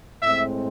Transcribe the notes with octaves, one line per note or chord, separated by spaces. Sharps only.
A2 G#3 C4 E5